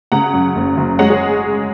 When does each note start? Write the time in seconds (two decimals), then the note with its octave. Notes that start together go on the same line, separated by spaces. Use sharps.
0.12 C#3 F#5 A#5
0.33 F#2
0.56 F#1
0.77 F#1
0.99 G#3 C#5 F#5
1.10 G#4 C#5